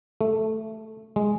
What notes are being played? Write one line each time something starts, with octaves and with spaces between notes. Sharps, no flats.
A3
G#3